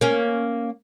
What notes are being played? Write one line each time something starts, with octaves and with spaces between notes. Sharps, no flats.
A#3 C#4